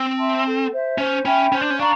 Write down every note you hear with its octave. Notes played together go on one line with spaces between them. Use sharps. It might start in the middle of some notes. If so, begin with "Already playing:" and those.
Already playing: C4
E5 A5 C6
A4
C5 E5
C#4 C5
C#4 E5 G5 B5
C#4 C5
D4
C#4
D4 F5 A#5 C#6